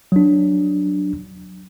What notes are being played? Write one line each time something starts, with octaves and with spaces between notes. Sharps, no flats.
F#3 D4